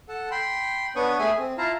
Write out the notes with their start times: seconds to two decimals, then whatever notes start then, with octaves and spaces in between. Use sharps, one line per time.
0.09 A4 F#5 A5
0.31 G5 B5 C6
0.96 B3 D4 B4 C#5 C#6 D#6
1.19 A3 G#4 E5 G#5 D#6
1.38 C4
1.58 E4 F4 F5 A5 A#5